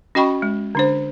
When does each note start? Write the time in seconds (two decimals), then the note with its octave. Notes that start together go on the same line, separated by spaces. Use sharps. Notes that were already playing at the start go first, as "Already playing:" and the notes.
0.15 C#4 F#4 D#5 G5 B5 C#6
0.42 G#3
0.75 D3 D4 C5